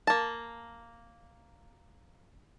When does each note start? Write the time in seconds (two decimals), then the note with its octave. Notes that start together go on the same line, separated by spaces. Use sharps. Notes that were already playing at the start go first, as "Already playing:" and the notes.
0.07 A#3 A5